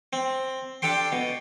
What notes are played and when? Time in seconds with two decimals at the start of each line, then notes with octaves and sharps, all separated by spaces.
0.13 C4
0.82 D4 G4 A4 G5 C6
1.12 B2